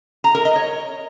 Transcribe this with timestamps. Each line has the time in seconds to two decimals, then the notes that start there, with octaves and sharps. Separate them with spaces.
0.24 A#5
0.35 A#4
0.45 D#5
0.56 C#5